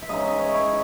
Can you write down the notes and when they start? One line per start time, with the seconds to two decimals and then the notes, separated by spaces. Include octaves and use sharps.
0.02 E5
0.09 C#3 G#3 D#4 D#5
0.24 E5
0.39 C#5
0.54 E4